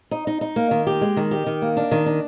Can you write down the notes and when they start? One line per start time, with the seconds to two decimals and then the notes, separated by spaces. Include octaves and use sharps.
0.11 D#4
0.27 D#4
0.41 D#4
0.56 A#3
0.71 D#3
0.87 G4
1.01 G#3
1.17 D#3
1.31 G4
1.46 D#3
1.62 A#3
1.77 D4
1.91 D#3
2.06 D4